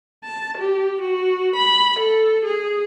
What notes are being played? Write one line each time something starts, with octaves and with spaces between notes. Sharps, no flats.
A5
G4
F#4
B5
A4
G#4